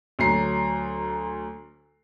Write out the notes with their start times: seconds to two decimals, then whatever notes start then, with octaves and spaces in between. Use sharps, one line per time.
0.19 D2 F#3 A#5 C7